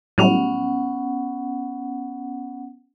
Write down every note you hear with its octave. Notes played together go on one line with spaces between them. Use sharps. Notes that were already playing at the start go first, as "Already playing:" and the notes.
A2 F#3 G3 B3 C#4 F#5